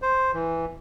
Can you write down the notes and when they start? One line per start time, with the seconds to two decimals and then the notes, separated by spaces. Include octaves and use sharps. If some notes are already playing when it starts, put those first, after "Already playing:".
0.02 C5
0.34 E3